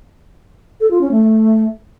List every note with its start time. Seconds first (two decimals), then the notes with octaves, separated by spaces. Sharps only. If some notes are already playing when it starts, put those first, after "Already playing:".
0.80 A4
0.91 F4
1.01 C#4
1.11 A3